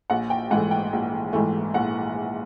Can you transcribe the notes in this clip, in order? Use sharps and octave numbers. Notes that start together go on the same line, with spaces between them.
A#1 F#5
G5
G#2 E3 A3 F#5
G5
A#1
G#2 E3 A3
A#1 F#5